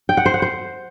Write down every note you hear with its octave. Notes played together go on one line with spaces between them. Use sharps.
G5
F#5
C5
F#5
C5